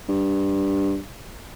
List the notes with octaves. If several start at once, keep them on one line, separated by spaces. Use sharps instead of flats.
G2